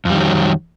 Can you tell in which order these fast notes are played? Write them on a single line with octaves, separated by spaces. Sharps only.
F2 G3 D#3 F#3